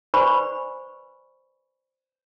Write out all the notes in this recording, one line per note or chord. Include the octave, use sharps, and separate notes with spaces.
B4 C5 D5 G#5 B5 C#6